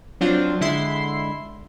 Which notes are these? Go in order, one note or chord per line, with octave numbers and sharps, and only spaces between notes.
F#3 C4 D4 F4 C5
D3 G#3 E4 E5 C6 C7